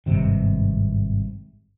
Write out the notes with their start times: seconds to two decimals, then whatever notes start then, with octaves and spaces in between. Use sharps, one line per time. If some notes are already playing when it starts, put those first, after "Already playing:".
0.06 G#1 G2 C3 D#3